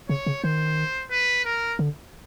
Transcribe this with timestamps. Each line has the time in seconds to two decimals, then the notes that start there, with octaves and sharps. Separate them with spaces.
0.09 C#3 C#5
0.26 C#3
0.43 D#3 C5
1.11 B4
1.45 A#4
1.79 D3